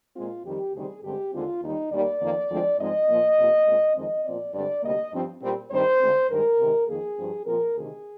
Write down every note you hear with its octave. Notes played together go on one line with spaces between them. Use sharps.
A#2 G#3 C4 F4
F2 D#3 G3 C4 G4
D2 C3 D#3 G3 C4 G#4
G2 D3 G#3 C4 G4
D#2 D3 G#3 C4 F4
D#2 D#3 G3 D#4
D#2 D#3 G3 A#3 D5
F2 D#3 A#3
D2 D3 F3 G#3 C4
G#2 F3 G#3 C4 D#5
A#2 F3 A#3
F2 C3 F3 A#3
A#2 G#3 C4
F2 D#3 G#3 C4 D#5
A#2 F3 C4 D5
G2 D3 G#3 C4 D5
D2 C3 G3 A#3 D#5
G2 F3 C4
A#2 G3 C4
G2 D#3 G3 C4 C5
D2 D3 G#3 C4
G2 D#3 G#3 A#4
C3 D#3 G#3
F2 D#3 A#3 G#4
G2 F3 C4
A#2 F3 C4 A#4
D2 C3 D#3 G#4